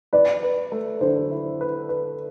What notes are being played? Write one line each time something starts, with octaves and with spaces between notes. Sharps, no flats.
B4 D5
B4
A3
D3 C5
E4
B4
B4